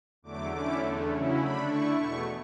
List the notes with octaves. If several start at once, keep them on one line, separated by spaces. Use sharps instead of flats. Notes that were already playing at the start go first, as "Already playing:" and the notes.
E2 D3 F#3 A3 D6
D3 A3 C#4 E4 D6
E2 D3 A3
C#3 F#3 C#4 E4
D3 A3 D4 B5
D3 A3 E4 C#6
E2 B2 A3 C#6